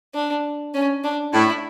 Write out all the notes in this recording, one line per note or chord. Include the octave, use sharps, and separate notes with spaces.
D4
C#4
D4
A2 E4